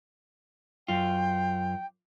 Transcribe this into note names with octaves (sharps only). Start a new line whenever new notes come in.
F#2 F4 G5